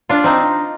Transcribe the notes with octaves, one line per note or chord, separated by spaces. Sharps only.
D4 F4
C4 D#4